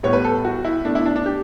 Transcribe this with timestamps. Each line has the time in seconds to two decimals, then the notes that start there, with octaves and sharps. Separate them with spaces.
0.03 A2 G3 B3 C#5
0.13 B4
0.24 A4
0.45 F#4
0.65 E4
0.85 B2 A3 D4
0.95 E4
1.06 D4
1.16 D4
1.26 G4